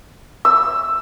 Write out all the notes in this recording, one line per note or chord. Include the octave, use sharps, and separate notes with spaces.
E6